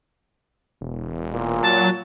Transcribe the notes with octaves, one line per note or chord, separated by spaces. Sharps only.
E1
A#2
F#3 A5